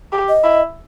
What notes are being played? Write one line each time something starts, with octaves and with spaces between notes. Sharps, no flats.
G4
D#5
E4